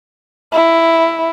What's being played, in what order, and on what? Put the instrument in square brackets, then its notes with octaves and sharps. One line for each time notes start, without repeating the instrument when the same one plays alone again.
[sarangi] E4